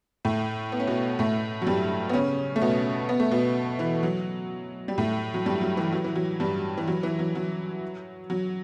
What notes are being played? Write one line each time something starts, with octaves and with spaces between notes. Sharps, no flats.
A2 A3
B3
C#4
B2 B3
A2 A3
F#3
G2 G3
B3
C#3 C#4
A3
B2 B3
B3
A3
B2 B3
E3
F#3
G3
A2 A3
F#3
G2 G3
F#3
E3
F#3
E3
F#3
G2 G3
E3
F#3
E3
F#3
F#3
F#3